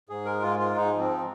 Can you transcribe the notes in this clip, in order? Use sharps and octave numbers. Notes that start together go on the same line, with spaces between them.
G#2 G#4
G#3 A#4
G#2 F4
G#3 F4
G#2 D#4
F3
C4